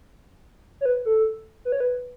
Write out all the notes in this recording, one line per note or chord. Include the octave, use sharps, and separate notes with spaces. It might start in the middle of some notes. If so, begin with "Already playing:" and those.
C#5
B4
A4
B4
C#5
B4